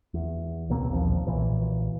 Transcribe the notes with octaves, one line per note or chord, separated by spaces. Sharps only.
E2
C#2 B2 A#3 C4
A#1 D#2 C#3 F3
B1 A#2 E3